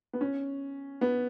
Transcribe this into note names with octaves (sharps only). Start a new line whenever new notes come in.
B3
C#4
B3